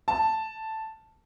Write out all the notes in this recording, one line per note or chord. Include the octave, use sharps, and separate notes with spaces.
A5